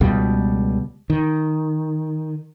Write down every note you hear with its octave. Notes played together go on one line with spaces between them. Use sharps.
C#2 B2 G3
D#3